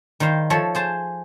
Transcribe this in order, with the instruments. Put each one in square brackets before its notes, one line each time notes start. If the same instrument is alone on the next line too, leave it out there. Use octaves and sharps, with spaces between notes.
[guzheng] D#3 G3 C5 F5
F3 A4 C#5 E5
G#4 C5 A5